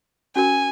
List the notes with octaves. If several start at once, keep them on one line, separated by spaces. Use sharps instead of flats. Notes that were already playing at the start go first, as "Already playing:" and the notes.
C#4 F#4 A#4 G#5